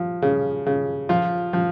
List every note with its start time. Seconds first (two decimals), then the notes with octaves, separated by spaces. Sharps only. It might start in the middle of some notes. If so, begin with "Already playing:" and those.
Already playing: F3
0.22 C#3
0.66 C#3
1.09 F3 F4
1.53 F3